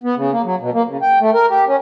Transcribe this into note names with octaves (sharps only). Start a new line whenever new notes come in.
B3
C#3
A#3
F#3
B2
A#3
C#3
G5
A3
A#4
G4
C#4